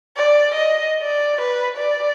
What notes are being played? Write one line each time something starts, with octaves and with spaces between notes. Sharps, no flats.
D5
D#5
D5
B4
D5